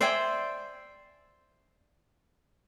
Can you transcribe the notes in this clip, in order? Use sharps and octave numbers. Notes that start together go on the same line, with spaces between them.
C5 D5 E5 G5 G#5